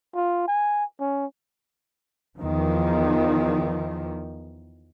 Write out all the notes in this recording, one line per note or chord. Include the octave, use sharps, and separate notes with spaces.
F4
G#5
C#4
E2 D#3 F3